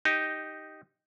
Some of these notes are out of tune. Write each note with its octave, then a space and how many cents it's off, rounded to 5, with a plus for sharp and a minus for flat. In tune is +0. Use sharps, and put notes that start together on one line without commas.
D#4 +0 G4 +0 D#5 +0